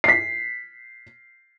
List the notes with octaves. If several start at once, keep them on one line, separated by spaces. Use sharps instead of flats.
B6 C7